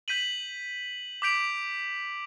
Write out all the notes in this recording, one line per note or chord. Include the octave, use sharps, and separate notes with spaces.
G6 B6 D#7 F#7
D6 G6 B6 D7 F7